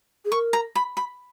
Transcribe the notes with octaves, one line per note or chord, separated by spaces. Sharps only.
G#4
A#4 C#6
A#5
B5
B5